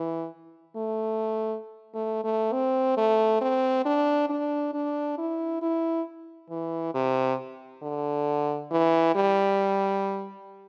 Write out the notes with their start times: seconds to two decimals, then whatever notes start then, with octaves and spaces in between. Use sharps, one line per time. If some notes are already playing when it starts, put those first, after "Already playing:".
Already playing: E3
0.76 A3
1.94 A3
2.24 A3
2.53 C4
2.97 A3
3.41 C4
3.85 D4
4.29 D4
4.74 D4
5.18 E4
5.62 E4
6.50 E3
6.94 C3
7.83 D3
8.71 E3
9.15 G3